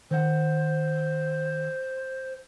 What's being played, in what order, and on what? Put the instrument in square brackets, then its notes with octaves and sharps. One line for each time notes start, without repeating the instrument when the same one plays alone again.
[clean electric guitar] D#3 F#5 [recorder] C5